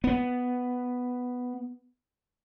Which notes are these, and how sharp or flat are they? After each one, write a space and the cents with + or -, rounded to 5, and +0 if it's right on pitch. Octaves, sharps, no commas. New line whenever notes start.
B3 +5